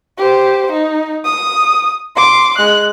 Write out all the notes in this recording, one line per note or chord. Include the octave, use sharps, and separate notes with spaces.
G4 C5
D#4
D#6
C6 D6
G#3 F#6